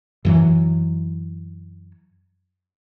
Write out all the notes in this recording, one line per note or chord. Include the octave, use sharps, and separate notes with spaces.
F#2 E3 F#3